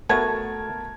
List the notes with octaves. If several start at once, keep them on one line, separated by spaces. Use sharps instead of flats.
A3 B3 F#4 A#4 A5 G#6